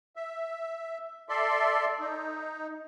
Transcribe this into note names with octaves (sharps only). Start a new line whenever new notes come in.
E5
A4 D5 E5 C6
D#4